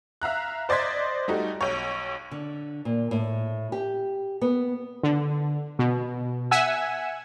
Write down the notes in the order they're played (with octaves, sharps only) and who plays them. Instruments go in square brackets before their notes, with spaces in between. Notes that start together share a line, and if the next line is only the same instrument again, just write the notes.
[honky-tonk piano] E5 F5 A#5 F#6
C5 D5 D#5 C6 G#6 B6
G3 A3 D#4 F#4
B1 C#5
[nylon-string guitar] D3
A#2
A2
G4
B3
[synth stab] D3
B2
E5 F#5 G#5 E6